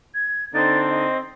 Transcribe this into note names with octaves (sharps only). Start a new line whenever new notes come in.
G#6
D3 C4 D#4 A6
D#5